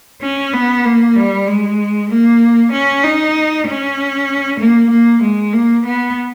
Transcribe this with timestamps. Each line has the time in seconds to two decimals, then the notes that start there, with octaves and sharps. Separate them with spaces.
0.22 C#4
0.53 B3
0.85 A#3
1.16 G3
1.47 G#3
2.10 A#3
2.72 C#4
3.04 D#4
3.66 C#4
4.60 A#3
4.90 A#3
5.22 G#3
5.53 A#3
5.85 B3